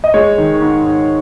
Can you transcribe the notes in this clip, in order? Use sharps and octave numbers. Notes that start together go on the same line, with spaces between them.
D#5
G#3 C#5
D#3
G#2
G#2